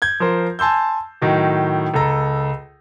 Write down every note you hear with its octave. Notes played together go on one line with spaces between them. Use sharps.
G6 G#6
F3 A#4 C5
G#5 A5 C6 E6 G6
A2 D#3 F#3
C#2 A4 A#5